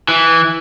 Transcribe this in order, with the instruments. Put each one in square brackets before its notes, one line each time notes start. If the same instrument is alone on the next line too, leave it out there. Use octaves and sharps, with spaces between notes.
[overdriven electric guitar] E3